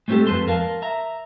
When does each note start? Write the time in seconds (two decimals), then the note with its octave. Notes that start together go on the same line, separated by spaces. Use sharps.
0.08 G#3 A3 C4 D4 G4 A4
0.27 F2 C4 B4 A5 C6
0.48 A#4 F5 A5
0.82 E5 A#5